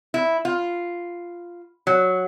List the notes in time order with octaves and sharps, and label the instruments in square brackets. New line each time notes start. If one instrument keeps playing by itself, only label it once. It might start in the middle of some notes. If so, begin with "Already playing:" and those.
[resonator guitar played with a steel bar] E4
F4
F#3